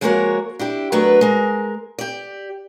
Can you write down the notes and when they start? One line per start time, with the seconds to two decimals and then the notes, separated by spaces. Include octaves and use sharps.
0.01 F3 G#3 A#3 F#4 A#4 C#5
0.59 D4 E4 G4
0.92 F#3 A3 B3 D4 A#4 B4
1.21 G#3 A#4
1.99 G4 D5